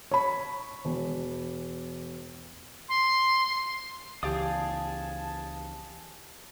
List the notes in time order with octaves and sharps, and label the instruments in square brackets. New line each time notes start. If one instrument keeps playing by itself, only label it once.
[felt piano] C#5 B5
E1
[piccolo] C6
[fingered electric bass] C#2 E3 [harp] G4 D5 [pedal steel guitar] G#4 F5 D#6 [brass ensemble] A5